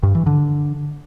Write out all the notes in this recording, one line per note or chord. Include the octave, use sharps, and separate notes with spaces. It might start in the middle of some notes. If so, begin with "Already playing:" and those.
G2
E3
D3